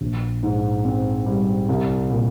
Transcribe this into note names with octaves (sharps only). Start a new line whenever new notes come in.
A#1
G#2
C4
G3
C2
A#2